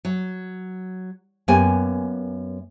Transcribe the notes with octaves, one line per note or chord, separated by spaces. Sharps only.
F#3
F#2 A#3 B3 G4 G#5